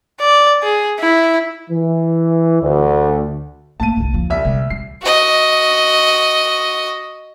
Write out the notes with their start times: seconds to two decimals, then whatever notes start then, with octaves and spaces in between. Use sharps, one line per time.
0.21 D5
0.63 G#4
1.00 E4
1.70 E3
2.63 D2
3.80 A3 A#3 A5 D#7
3.97 G1 C2
4.14 D#2 F3
4.30 C2 E5
4.45 C3 G3
4.70 G3 C7
5.03 F#4 D#5